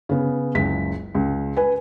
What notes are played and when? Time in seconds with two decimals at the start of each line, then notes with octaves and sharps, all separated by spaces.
0.09 C#3 B3
0.55 F#1 C#2 B6
1.15 C#2
1.57 B4 G#5